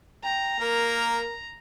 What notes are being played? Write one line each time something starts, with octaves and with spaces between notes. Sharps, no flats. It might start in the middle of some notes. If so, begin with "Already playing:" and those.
G5 A#5
A#3 A#4